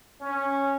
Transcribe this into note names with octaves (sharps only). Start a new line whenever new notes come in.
C#4